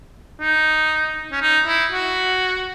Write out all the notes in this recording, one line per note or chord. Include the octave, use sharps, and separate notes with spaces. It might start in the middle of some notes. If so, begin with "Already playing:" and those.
D#4
C#4
D#4
E4
F#4